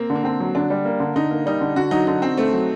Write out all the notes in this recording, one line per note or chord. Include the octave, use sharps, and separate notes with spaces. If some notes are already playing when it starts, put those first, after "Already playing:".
Already playing: A#3 C4
D3
A#3
D3 C4
F#3
D3 D4
G3
A#3
D3
D3 D#4
A#3
G3 D#4
D3
D3 F#4
F#3 D#4
D3 D#4
D3 C4
A3 C4
F#3